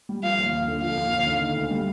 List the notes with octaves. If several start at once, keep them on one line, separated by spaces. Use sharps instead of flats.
G3
F3 F5
D#2
D#2
D3
F3 F5
D#2
D#2
D3
D#3
D2
G3